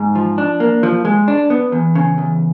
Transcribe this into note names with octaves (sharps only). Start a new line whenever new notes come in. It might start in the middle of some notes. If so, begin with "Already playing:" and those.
Already playing: G#2
F3
D4
A#3
F3
G#3
D4
B3
E2
C#3
E2